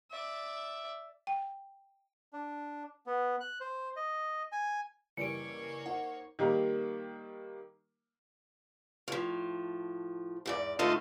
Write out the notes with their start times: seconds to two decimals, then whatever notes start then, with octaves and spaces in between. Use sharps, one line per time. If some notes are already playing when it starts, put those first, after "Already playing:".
0.11 D5 E5
1.27 G5
2.33 D4
3.06 B3
3.41 F#6
3.60 C5
3.96 D#5
4.52 G#5
5.17 F#1 E3 G3 A#3 C#5 C#7 D7
5.86 D#4 A#4 C5 F#5
6.39 D#3 G3 A#3 A#4
9.08 A2 F3
10.46 E2 G#2 D5
10.79 G#2 D3 A3 D#4 F4 A4